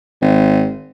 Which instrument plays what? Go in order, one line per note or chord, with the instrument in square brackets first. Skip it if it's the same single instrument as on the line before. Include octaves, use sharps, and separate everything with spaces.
[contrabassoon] G#1